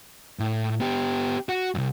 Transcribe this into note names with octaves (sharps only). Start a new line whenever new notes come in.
A2
B3 G4
F#4
C2 F#2